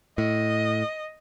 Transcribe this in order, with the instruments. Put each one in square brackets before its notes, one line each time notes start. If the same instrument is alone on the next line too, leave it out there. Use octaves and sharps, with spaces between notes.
[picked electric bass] A2 [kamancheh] D#5